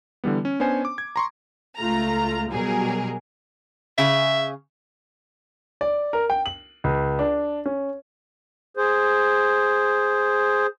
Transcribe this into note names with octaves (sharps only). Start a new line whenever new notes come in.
D3 E3 G3 B3
C#4
B3 C#4 D4 C5 G#5
D6
G#6
A#5 C6 C#6
C#2 A3 F4 A#5
B2 F#3 G3 G#4 A#4
C#3 G#4 E5
D5
A#4
G5
F#7
C#2
D4
C#4
G#4 C5